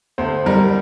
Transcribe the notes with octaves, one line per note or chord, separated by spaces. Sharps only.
D2 C5
G3 A#4